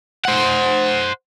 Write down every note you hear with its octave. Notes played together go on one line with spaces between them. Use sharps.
C5 F#5